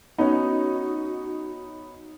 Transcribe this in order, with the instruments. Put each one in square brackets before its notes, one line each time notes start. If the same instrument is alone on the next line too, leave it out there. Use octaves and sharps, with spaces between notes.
[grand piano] B3 C#4 [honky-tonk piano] D#4 [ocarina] F#4